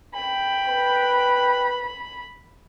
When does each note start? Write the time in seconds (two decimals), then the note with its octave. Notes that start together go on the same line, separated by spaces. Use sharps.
0.15 G5 B5
0.69 B4